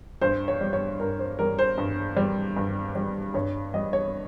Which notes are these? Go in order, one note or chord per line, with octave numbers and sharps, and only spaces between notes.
G2 C5
C#5
G3
C#5
G2 A#4
C5
G3 A#4
C5
G2
G3
G2
G3
G2 C#5
G3 D#5
C#5